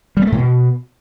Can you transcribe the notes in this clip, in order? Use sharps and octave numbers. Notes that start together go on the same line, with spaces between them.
G3
B3
A3
A2
B2